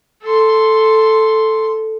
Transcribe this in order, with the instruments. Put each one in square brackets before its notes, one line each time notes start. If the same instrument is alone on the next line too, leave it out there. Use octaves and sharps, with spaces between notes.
[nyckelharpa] A4 C6